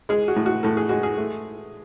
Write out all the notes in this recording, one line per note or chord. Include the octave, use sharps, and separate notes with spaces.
G#3 G#4
F#4
A2
F#4
A2 A4
G#4
G#3 F#4
G#4
A3